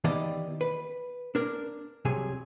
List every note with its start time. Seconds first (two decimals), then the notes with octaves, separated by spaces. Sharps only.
0.04 D#3 E3 B3 G4 D5 D#5
0.61 B4
1.35 D4 A#4
2.05 C2 C3 F#3 G#4